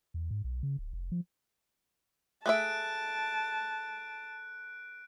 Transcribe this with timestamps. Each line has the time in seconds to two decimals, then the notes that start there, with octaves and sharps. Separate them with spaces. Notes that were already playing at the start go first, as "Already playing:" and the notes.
0.14 E2
0.31 G#2
0.44 B1
0.63 C#3
0.78 D1
0.93 F1
1.12 F3
2.46 A3 G#4 E5 A5 F#6 D7